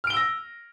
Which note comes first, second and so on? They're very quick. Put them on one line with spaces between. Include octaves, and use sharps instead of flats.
F6 D7 G7 E6 A#6